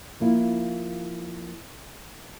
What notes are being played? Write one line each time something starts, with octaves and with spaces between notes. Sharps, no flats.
F3 A#3 E4 F4